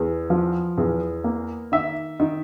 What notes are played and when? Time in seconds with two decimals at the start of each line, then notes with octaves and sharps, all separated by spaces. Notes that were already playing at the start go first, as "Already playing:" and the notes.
Already playing: E2
0.30 F3
0.78 E2
1.24 A#3
1.72 D#3 E5
2.20 D#3